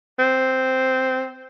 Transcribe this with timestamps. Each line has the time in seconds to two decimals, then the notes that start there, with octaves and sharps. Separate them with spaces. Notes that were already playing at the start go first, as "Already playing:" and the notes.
0.19 C4